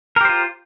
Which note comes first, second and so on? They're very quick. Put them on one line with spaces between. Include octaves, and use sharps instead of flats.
A#4 G4 C5 F4